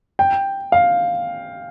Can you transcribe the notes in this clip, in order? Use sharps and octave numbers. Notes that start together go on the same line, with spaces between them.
G5
F5